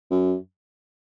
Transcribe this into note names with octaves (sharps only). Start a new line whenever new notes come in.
F#2